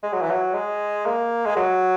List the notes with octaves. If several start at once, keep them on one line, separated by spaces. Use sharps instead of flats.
G#3
F#3
E3
F#3
G#3
A#3
G#3
F#3